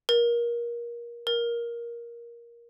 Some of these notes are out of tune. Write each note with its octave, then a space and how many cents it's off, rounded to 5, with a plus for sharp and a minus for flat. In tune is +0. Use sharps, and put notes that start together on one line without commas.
A#4 +25
A#4 +15